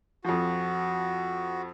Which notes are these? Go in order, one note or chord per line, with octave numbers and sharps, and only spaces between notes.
F2 F3 F#4